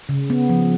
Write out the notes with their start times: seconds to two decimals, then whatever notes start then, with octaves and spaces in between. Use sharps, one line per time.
0.09 C#3
0.30 B3
0.49 F3